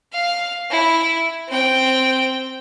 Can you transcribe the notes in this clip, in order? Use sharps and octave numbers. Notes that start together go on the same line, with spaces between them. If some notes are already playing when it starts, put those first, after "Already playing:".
F5
E4
C4 G5